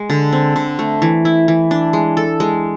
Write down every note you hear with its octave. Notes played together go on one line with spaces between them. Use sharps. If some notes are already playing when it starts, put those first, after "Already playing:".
Already playing: G#3
D3
C4
D3
A3
E3
E4
E3
D4
G#3
A4
G#3